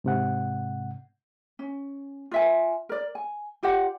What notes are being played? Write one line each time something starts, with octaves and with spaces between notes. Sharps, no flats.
G#2 C3 F#5
C#4
F4 E5 G#5
A#4 D5
G#5
F4 G4 D5 F#5